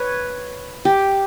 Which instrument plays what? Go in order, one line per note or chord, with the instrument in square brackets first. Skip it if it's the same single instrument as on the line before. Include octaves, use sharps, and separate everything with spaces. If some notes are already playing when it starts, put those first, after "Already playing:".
Already playing: [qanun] B4 C#5
G4